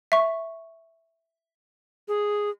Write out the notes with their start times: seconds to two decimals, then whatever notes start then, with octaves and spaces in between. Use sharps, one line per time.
0.12 E5 C#6
2.08 G#4